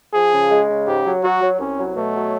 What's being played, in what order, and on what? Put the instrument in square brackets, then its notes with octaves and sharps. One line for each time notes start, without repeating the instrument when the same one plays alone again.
[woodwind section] F3 [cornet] G#4
[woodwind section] C#3
G#3
C#3
[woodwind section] G#2 [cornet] G4
[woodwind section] F#3
[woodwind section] F#3 [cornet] F#4
[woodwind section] F#3
[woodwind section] C2 [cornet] C#4
[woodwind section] F#3
[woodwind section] B2 [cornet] A3
[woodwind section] F#3